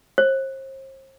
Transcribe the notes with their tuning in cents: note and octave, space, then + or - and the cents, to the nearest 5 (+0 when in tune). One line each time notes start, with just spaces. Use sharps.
C5 +40